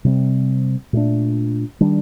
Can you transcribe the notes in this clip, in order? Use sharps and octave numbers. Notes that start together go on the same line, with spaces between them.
C3 G3 C4
A#2 A3 D4
D#3 G3 D4